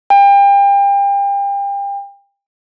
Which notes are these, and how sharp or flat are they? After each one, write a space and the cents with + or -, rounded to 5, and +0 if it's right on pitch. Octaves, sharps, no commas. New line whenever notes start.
G5 +35